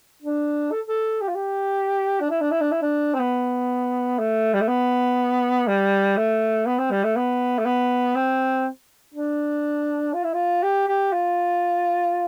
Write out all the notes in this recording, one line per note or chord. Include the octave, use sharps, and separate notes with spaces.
D4
A4
A4
G4
F4
G4
D4
E4
D4
E4
D4
E4
D4
C4
B3
A3
G3
A3
B3
G3
A3
B3
C4
G3
A3
B3
A3
B3
C4
D4
F4
E4
F4
G4
G4
F4